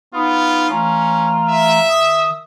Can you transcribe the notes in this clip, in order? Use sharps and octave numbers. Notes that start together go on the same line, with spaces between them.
B3 D#4 F4
E3 A3 C#4 F4 A#5
E5
D#3 D#6